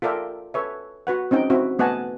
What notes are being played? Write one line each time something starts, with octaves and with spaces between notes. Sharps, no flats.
F4 A4 A#4 D5 E5 G5
A4 B4 C#5 E5
F#4 B4 F#5
C4 C#4 D#4 G5
C4 E4 F#4
A3 B3 D#5 F#5 G#5 A5